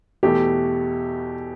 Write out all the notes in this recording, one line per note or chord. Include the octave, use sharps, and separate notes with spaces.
E2 B2 A3 E4 G4 A4